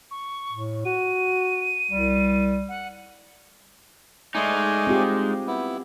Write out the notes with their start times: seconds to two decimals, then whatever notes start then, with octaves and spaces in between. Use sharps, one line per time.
0.11 C#6
0.52 A2
0.85 F#4 D#7
1.91 C2 G3
2.69 F#5
4.35 G#3 A3 D#4 D5 G#5
4.87 C4 F4 G4
5.47 B3 E4